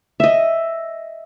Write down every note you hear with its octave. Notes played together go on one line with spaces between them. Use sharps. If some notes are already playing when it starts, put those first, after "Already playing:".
D#5 E5